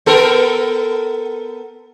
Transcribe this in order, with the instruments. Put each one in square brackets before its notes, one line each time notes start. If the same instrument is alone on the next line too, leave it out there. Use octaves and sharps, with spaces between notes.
[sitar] B3 A4 A#4